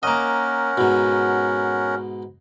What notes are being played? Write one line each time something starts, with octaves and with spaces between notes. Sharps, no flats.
A#3 C#4 A#4 D#5 F#5
G#2 B2